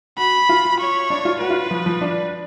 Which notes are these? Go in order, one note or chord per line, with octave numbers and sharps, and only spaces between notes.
F#4 B5
F4
C#5
D4
F4
F#4 B4
F4
F3
F3
D4